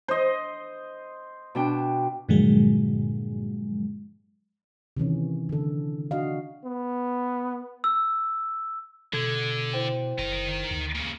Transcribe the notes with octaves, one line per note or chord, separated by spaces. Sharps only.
C5 D#5
B2 D4 G5
G2 A#2 D3 F3 F#3 G#3
C3 D#3 E3 C#4
D3 A4
D4 F#4 D#5 F5
B3
E6
B2 D3 A4 G#6
E4 C5 G5
F#1 D#3 A#5
D2
A#2 C#3